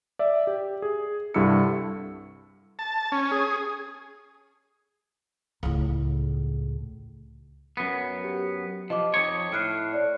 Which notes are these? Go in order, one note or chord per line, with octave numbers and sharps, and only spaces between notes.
D5 E5
G4
G#4
C2 G2 E4 A4 E6 C#7
A5
C#4
G#4
C#2 A2
F#2 B3
G4
F3 D#5 D6
F2 D#4 C#5
A2 F6 F#6 C7
C#5 D5